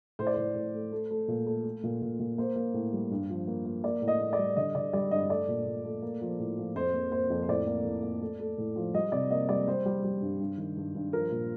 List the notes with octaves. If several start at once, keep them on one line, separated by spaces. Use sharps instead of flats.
A2 C5
D5
A2 C5
A2
A3
A3
A3
A#2
A3
A3
A#2
A#2
A#2
A#3 C5
A#3
A2
G3
G2
F3
A#3
A#3
A#3 D5
A2
D#5
A#3
D5
G3
D3 D#5
D3 D5
G3 D5
G2 D#5
A3 D5
A#2
A#2
A3
A#3
F3
A2
F3
F2 C5
A#3
A#3 C5
F2
C5
A2 D5
A#3
A2
A#3
A3
A3
A2
F3
G3 D#5
C3 D5
A#3 D#5
G3 D5
G3 C5
G3
G3
G2
G2
D#3
G2
G2
F3 A#4
A#2